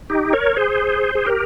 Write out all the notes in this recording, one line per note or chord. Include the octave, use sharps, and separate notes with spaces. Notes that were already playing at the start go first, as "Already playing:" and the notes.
D#4 G4
A#4 C#5
G#4 C5
G#4
G4 A#4